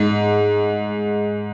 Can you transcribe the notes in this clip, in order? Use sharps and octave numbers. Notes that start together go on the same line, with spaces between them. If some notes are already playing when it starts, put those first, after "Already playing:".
Already playing: G#2